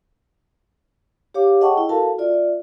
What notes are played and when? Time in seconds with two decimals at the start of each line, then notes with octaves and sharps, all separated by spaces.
1.34 G4 C#5 F5 D6
1.61 G#4 D#5 F#5 G5 A5 C#6
1.77 E4
1.89 F#4 A4 A#4 F5 A5
2.18 F4 D5 E5